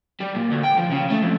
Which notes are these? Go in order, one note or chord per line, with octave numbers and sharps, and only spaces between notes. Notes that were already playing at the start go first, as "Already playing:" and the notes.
G3
A#2
D2
G5
F3
C#3
A3
F2